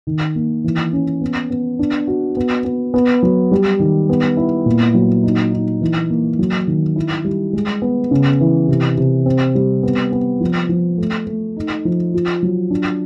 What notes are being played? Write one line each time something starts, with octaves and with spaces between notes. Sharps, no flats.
D#3
A#3
E3
C#4
B3
B3
D4
F#4
B3
B3
B3
F#3
G3
D#3
B3
E4
A#2
F#3
D#4
D#4
E3
A#3
F#3
D#3
E4
G3
G#3
B3
C#3
E3
C3
C3
C4
G3
B3
B3
F3
F3
A3
A3
D#4
F3
F4
F#3
D4